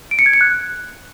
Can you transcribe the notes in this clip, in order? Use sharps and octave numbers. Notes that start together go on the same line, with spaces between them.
D7
C#7
G#6
C#7
F#6